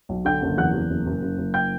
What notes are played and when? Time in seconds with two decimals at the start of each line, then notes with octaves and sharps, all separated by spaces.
0.09 B1
0.25 D3 G5 G6
0.42 F#1
0.57 E2 F#5 F#6
0.74 E2
0.90 F#1
1.06 F#1
1.23 F#1
1.38 F#1
1.54 G5 G6